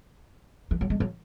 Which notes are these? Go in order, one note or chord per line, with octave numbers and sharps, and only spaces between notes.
E3
F#3
G#3
F#3